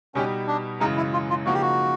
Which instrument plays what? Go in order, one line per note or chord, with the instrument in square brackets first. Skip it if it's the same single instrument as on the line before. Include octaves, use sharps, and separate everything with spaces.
[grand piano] B2 G3 B3 D#4 G4 [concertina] C#4
[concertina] D4
[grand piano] F#2 C#3 E3 G#3 [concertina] D#4
[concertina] E4
F4
F4
[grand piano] C#3 F3 A#3 D#4 [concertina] F#4
[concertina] G4
F#4